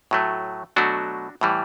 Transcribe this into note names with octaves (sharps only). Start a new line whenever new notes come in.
A2 F#3 A3
B2 F#3 A3 D4 F#4
A2 E3 G3